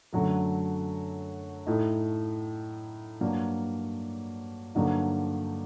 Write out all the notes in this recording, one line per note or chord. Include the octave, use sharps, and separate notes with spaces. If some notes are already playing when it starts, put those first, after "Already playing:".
F#2 D3 F#3 A3
A2 A3 D#4
G2 F#3 A#3
G2 D3 F#3 A#3 D#4